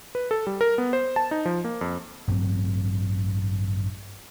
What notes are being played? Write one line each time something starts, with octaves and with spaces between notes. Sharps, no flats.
B4
A4
G3
A#4
B3
C5
A5
D#4
F3
A#3
F2
A1 G2 F#3 C4